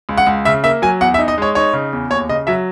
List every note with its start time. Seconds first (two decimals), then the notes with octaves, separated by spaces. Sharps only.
0.09 C#2
0.18 F#5
0.27 C#2
0.45 C#3 E5
0.64 A#3 E5
0.82 F#3 G#5
1.01 E2 F#5
1.14 E5
1.19 D#4
1.28 D#5
1.38 G#3 C#5
1.55 D#4 C#5
1.73 C#3
1.93 E2
2.10 D#2 C#5
2.29 C#3 D#5
2.47 F#3 E5